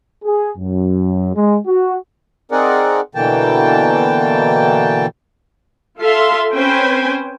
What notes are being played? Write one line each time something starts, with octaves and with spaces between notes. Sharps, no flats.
G#4
F#2
G#3
F#4
C4 D#4 G#4 A#4 D5 F#5
B2 D3 E3 A#3 G5 A5
F4 A4 E5 F5 C6
C4 C#4 B4 C5 G5 G#5